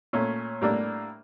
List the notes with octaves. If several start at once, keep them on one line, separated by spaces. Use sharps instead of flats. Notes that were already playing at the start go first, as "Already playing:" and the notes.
A#2 A3 C#4
A2 G3 A#3 D4